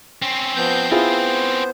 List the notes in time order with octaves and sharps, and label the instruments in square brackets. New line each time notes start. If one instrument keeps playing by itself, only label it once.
[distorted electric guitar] C4 C#4
[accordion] F3 B3 G6
[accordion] B3 C5 [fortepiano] E4 F4 G#4